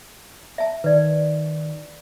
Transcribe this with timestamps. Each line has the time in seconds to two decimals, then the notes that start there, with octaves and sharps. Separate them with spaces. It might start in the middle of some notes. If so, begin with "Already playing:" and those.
0.58 E5 A5
0.84 D#3 B4 D5